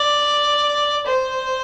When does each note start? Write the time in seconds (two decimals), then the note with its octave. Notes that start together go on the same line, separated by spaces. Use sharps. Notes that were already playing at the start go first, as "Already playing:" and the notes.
Already playing: D5
1.06 C5